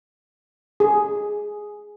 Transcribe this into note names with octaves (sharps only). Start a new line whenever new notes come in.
G#4